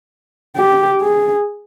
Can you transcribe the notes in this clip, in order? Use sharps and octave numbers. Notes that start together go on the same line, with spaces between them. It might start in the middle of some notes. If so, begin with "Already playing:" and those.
G4
G#4